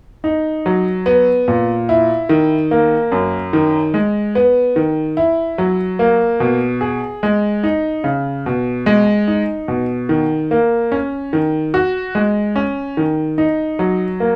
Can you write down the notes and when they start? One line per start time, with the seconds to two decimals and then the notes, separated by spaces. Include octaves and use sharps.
0.24 D#4
0.66 F#3
1.06 B3
1.48 A#2
1.89 E4
2.29 D#3
2.71 A#3
3.12 F#2
3.53 D#3
3.94 G#3
4.35 B3
4.76 D#3
5.17 E4
5.58 F#3
5.99 A#3
6.40 B2
6.81 G#4
7.23 G#3
7.63 D#4
8.04 C#3
8.46 B2
8.86 G#3
9.28 D#4
9.68 B2
10.09 D#3
10.51 A#3
10.92 C#4
11.33 D#3
11.74 F#4
12.15 G#3
12.56 C#4
12.97 D#3
13.38 D#4
13.79 F#3
14.20 A#3